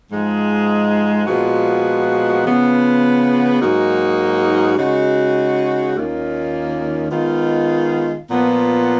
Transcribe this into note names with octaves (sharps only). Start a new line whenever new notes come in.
G#2 F3 G#3
A#2 F3 G#3 B3 F#4
C#3 F3 B3
G#2 F#3 A#3 D#4 F#4
C#3 G#3 D#4 F#4
D#2 D#3 A#3 C#4 F4
D#3 G#3 B3 F4
A#2 F3 B3